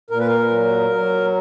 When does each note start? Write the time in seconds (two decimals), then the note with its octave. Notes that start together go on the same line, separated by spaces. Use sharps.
0.10 A#2 A#4
0.19 B4
0.27 A#4
0.51 F#3
0.90 F#3